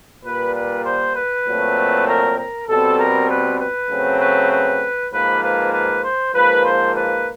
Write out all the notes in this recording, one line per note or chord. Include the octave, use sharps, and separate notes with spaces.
A#2 G3 A#3 B4
B4
C5
B4
A#2 F#3 A3 C4
A#4
A#4
B2 G3 C4 A4
A#4
B4
B4
C#3 F#3 A3 C4
B4
B4
G#2 F3 A#3 B4
B4
B4
C5
G#2 F3 A#3 B4
C5
B4